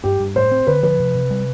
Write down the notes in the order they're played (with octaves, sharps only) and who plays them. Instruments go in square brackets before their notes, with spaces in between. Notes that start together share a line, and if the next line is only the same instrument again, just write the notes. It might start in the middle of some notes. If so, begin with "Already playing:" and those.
[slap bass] G2 [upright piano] G4
[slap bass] G2
[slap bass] A2 [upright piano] C5
[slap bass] C4
[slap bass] D3 [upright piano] B4
[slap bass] F3 [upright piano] B4
[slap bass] C3
C3
G3